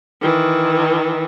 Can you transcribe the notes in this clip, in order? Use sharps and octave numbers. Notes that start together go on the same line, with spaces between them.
D#3 E3